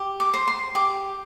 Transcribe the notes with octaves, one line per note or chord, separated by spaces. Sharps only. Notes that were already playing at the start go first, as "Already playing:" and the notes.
Already playing: G4
D6
C5
C6
G4 D6